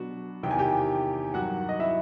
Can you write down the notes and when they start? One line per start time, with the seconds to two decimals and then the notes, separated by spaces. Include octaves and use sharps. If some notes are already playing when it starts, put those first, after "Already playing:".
Already playing: B2 F#3 B3 D4 F#4
0.43 E2 C3 D#3 G5
0.51 G#5
0.59 G4 G5
1.34 G2 D#3 F#3 F#4 F#5
1.69 D#5
1.80 E4 E5